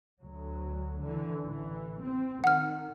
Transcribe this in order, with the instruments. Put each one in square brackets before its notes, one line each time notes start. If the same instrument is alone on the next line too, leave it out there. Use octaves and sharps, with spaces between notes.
[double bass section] D2 F#3
D3 E3
A1 E3
C4
[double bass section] D#3 [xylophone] F#5 F6